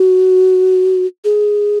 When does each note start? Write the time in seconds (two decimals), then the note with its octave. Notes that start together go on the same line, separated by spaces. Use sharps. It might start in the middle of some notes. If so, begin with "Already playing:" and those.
Already playing: F#4
1.25 G#4